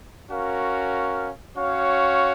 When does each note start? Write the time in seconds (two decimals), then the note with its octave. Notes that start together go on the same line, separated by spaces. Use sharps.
0.30 C#4 F#4 A#4 F5
1.55 C#4 F#4 C#5 F5